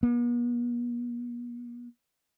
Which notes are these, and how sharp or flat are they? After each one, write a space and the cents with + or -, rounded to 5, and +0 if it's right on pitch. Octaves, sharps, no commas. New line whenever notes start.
B3 -45